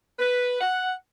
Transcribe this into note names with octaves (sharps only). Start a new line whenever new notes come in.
B4
F#5